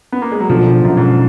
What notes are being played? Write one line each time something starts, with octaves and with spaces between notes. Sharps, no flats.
B3
A#3
G#3
F#3
B2 D3 F3
F#2 B2
G#2